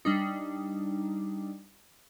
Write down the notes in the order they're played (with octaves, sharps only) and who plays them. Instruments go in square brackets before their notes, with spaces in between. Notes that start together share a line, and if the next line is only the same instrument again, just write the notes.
[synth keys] G3 D4 D#4